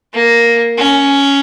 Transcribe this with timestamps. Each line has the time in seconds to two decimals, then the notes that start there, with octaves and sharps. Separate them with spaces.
0.13 A#3
0.78 C#4